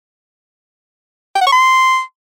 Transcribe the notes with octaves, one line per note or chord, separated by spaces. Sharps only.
G5
F#5
C#6
C6